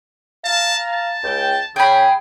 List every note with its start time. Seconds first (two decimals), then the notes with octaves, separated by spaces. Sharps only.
0.44 F5 A5 A#5
0.87 A5
1.23 C#2 G5
1.76 C#3 G#4 G5 B5